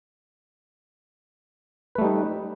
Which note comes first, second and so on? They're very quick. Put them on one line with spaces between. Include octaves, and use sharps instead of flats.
B4 A3 G3 D#4